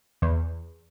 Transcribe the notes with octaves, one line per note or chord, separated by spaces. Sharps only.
E2